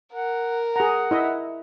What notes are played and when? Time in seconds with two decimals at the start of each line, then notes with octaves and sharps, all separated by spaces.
0.13 A#4 F#5
0.76 G#4 F#5 A#5
1.11 E4 D#5 E5